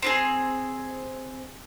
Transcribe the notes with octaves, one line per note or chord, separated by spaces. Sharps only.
C4 E4 G#4